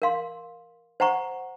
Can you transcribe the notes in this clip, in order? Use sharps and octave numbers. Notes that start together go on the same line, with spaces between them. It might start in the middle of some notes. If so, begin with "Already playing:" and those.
A#4 F5 C6
C5 F#5 A#5 C#6